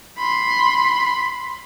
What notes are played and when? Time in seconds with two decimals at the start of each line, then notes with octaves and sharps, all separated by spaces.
0.19 B5 C6